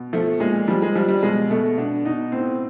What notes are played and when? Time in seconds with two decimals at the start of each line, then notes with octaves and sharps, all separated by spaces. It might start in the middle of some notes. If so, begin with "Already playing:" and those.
Already playing: B2
0.13 F3 A3
0.40 A#2 G#3
0.68 F3 G3
0.82 G#3
0.95 F3 G3
1.08 G3
1.23 B2 G#3
1.50 B2 A3
1.78 B2 D4
2.05 B2 D#4
2.32 A2 C4